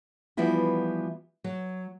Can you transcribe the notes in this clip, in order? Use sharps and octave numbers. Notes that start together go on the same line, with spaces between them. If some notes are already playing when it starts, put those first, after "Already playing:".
E3 F3 G3 B3 E4 F#4
F#3